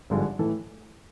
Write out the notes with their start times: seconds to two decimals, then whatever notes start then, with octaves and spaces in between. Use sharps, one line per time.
0.10 G#1 G2 D3 F3 G#3
0.39 A2 E3 A4